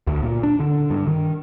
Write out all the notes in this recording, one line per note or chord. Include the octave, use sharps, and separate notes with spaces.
D2
A#2
D4
D3
G2
D#3